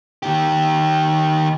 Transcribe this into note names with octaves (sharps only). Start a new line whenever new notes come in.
D#3 G4